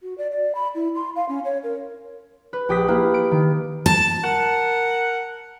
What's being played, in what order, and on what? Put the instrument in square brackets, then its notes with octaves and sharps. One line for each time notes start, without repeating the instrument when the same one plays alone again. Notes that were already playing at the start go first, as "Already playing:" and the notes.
[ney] F#4
D5
D5
B5
E4
C6
F5
C#4
C#5
A#4
[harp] B4
A#1 G4 D#6 B6
A#3 E4 B4
D7
D#3
[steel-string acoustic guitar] A5
[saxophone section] A#4 F#5